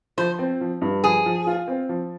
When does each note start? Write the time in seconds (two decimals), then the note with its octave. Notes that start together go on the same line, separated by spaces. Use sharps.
0.17 F3 C5
0.39 C4
0.61 F3
0.81 G2
1.03 F3 G#4
1.26 F3
1.47 F4
1.68 C4
1.89 F3